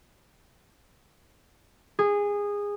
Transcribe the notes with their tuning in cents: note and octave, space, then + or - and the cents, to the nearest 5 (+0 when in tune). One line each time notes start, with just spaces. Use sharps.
G#4 -20